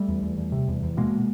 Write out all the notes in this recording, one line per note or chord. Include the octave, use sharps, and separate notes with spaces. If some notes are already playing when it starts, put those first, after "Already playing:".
Already playing: G3 A3
E2
E2
E2
C3
E2
E2
B2 G#3 A#3